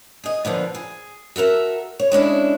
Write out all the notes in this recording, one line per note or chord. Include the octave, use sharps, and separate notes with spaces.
G#4 D#5
A#2 D3 F3 B3
G#4
F#4 A4 A#4 E5
C#5
G#3 C#4 D4 E4